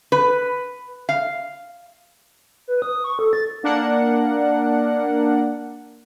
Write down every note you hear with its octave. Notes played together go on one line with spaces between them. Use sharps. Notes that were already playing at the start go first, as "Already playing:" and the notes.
B4
F5
B4
D#6
C#6
A4
A6
A#3 D4 A#4 F#5